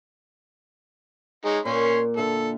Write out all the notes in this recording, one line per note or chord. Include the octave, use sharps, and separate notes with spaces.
G#3 D#4 C#5
A#2 C#4 C#5 C6
D3 A4 E5 F5